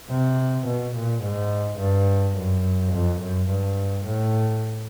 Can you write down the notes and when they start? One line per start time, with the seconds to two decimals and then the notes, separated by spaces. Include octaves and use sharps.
0.10 C3
0.67 B2
0.95 A#2
1.22 G#2
1.79 G2
2.36 F#2
2.93 F2
3.21 F#2
3.49 G2
4.06 A2